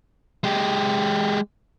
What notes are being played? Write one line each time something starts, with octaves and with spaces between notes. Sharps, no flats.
G#3 G4